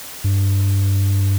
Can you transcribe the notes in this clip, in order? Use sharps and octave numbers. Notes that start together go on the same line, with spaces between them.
G2